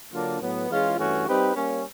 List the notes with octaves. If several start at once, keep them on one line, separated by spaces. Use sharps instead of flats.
D3 F#3 A#3 D4 F4
A2 F#3 B3
E3 G#3 C#4 F4 G#4
G2 E3 A3 C#4 F#4
G3 C4 D#4 G4 B4
G3 A#3 C#4